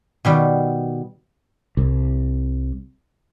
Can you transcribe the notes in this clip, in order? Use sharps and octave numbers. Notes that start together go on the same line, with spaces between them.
B2 D#3 G3
C2